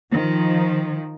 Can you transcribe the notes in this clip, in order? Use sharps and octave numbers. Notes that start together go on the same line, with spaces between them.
D#3 F3